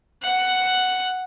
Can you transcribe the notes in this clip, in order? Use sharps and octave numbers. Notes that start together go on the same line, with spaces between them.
F#5